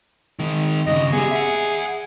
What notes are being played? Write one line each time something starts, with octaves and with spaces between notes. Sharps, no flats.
D#3 G#3
G2 C#3 D#5
B3 G4 G#4
E5 F#5